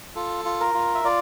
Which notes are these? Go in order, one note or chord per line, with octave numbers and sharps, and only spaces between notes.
F4 A4
F4
A#4
F4
E5
F4 D5